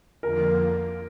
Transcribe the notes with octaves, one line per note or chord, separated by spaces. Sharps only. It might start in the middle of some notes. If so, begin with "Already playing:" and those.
F2 D3 F3 A#3 A#4